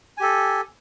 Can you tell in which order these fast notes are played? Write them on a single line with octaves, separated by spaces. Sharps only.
G#5 G4 A4